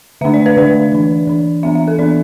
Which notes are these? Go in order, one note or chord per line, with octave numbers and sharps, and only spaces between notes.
D3 A3 D4 E5
D5
B4
D3 A3 D4 D5
E3 D4
E3 D4
E3 B3 D4 E5
E5
A4
E3 B3 D4 D5